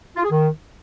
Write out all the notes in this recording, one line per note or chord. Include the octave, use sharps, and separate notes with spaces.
F4
G#4
D#3